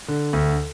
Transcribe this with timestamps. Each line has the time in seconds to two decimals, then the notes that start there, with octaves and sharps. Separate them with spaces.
0.08 D3
0.33 D2